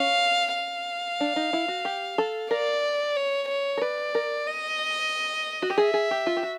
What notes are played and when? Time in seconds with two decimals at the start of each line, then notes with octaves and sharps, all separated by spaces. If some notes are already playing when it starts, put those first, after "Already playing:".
Already playing: C#4 F5
0.54 F5
1.20 D4
1.36 D#4
1.53 E4
1.68 F#4
1.85 G4
2.18 A4
2.51 A#4 D5
3.16 C#5
3.48 C#5
3.77 A#4
3.81 B4 D5
4.15 A#4
4.47 D#5
5.62 F#4
5.70 G4
5.77 G#4 E5
5.94 G#4
6.11 G4
6.27 F4
6.37 G4
6.43 F#4